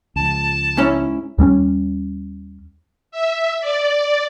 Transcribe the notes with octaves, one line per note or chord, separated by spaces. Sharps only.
C#2 F3 A5
G#2 C#4 E4
D#2 G3 C4 C#4
E5
D5